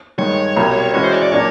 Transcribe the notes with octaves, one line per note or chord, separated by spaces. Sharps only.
G2 D#3 G#3 C#5
C2 B2 G3
E3 G#3 C#4 F#4 C#5
C5
C#5
D5
A#2 F#3 A#3 D4 C#5